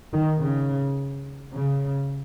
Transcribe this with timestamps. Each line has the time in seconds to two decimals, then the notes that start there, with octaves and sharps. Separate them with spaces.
0.13 D#3
0.41 C#3
1.54 C#3